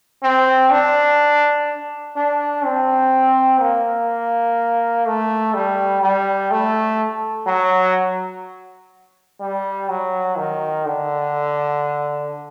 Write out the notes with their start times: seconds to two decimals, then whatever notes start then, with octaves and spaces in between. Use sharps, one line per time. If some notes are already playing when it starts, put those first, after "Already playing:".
0.23 C4
0.71 D4
2.17 D4
2.65 C4
3.60 A#3
5.06 A3
5.54 G3
6.02 G3
6.51 A3
7.47 F#3
9.41 G3
9.89 F#3
10.36 D#3
10.86 D3